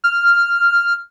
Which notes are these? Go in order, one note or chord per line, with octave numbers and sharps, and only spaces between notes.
F6